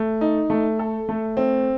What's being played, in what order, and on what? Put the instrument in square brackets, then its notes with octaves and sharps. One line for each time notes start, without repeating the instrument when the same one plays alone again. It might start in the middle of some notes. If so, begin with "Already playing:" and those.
Already playing: [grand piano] A3
D#4
A3
A4
A3
C4